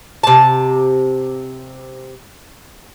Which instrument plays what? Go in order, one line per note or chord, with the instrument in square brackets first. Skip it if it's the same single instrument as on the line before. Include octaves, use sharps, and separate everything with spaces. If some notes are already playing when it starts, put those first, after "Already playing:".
[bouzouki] C3 A5